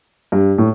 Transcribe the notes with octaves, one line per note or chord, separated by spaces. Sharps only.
G2
A2